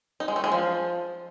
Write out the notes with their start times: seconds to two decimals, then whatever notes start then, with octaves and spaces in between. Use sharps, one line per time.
0.20 D#4
0.28 G#3
0.36 A3
0.44 G#3
0.52 F3